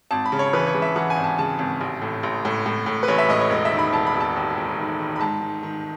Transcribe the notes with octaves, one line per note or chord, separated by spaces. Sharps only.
G#1 A5
B5
C#3
C#5
E3 B4
C#5
C#3
E5
E3 F#5
G#5
G#1
A5
C#3 A5
G#1
A1
A2
A1
A2
A2
A2
B4
A1 C#5
E5
A2 D#5
C#5
E1 D#5
E5
D#3
B5
E1 A5
B5
E1
A5
D#2
E1
D#3
D#3
B5
G#2 A5
D#3
D#3